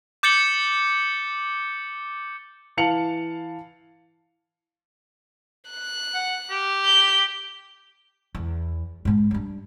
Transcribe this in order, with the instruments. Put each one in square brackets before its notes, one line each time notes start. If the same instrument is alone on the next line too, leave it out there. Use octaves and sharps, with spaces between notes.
[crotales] D6 G6 A6 C#7 F#7 G7
[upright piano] E3 F5 A5 C#7 F7 F#7
[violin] F#6
[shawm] F#5
G4
[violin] G6
[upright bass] E2
G#2 B3
G3 D4